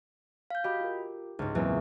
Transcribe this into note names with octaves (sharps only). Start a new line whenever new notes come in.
F5 G6
F#4 G4 D#5 B5
F4 A#4
C#2 G#2
E2 A#2 F#3 A#3 C4